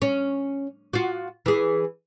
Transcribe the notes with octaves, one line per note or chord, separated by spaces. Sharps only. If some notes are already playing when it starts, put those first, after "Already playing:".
C#4
F4 F#4
E3 G#4